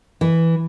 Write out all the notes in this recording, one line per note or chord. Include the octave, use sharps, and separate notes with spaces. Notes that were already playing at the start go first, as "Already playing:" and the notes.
E3